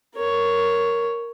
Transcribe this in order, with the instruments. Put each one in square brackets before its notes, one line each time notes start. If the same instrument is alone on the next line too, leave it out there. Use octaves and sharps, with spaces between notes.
[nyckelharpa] A#4 C#5